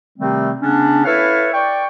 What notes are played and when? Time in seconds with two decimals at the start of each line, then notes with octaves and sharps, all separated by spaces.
0.19 C3 D#3 G3 A3 C4
0.62 C#3 B3 C#4 D4
1.05 E4 A4 B4 C#5 E5 F5
1.54 D5 G5 C#6